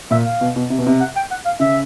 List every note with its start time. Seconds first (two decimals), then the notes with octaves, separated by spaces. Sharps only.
0.11 A#2 E5
0.25 F5
0.41 B2
0.56 B2
0.70 C3
0.79 B2
0.87 C3
1.00 F#5
1.16 G5
1.31 F#5
1.45 F5
1.60 C#3 E5